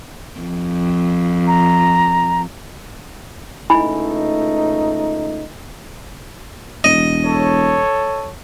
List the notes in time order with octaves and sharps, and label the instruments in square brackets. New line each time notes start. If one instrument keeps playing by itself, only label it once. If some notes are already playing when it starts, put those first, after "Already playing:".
[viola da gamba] F2
[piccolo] A#5
[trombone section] C#2 A3 D#4 [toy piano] E4 G#5 B5
[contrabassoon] E1 [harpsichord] D#5
[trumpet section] A4 C#5